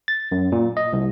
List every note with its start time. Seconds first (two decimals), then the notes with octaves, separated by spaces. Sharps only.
0.08 A6
0.32 F#2
0.52 A#2
0.77 D#5
0.93 C2